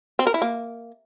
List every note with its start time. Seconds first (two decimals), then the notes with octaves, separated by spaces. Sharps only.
0.19 C4
0.27 A#4
0.34 E4
0.42 A#3